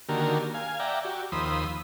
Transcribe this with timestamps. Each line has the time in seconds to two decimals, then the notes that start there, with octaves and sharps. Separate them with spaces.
0.09 D3 D#3 A#3 F#4 G4 A#4
0.54 F5 G#5
0.80 D5 E5 F#5 G5 A#5
1.05 F#4 G4
1.32 D#2 F3 B5 C6 D#6 E6